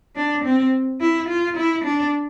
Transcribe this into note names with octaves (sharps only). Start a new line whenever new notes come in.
D4
C4
E4
F4
E4
D4